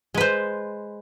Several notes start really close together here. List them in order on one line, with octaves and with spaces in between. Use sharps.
G#3 B4 C5